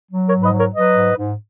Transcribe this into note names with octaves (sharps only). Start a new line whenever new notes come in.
F#3
A#4 C#5
G#2
B4 D#5
F#3
A#4 C#5
F#3 B4 D#5
G#2
G#2